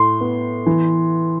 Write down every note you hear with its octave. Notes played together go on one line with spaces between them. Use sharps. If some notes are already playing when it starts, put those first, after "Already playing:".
Already playing: A2 C6
B3
E3